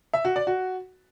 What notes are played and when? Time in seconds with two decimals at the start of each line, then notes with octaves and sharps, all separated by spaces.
0.14 E5
0.25 F#4
0.36 D5
0.47 F#4